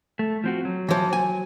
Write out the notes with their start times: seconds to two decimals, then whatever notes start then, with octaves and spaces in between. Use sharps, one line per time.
0.19 A3
0.44 F3 C4 F#4
0.65 F#3
0.89 E3 F3
1.13 G#5